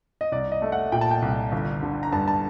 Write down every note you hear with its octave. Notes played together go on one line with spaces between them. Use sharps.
D#5
C2 D5
D#5
A3
F#5
A#2 G5
A5
G5
C2
G1
D3
A#5
G2 A5
A5